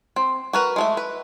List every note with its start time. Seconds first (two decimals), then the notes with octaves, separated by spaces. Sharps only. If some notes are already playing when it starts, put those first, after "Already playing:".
0.16 C4
0.53 F#4 A#4 B4
0.76 G#3 A3 E5
0.97 B4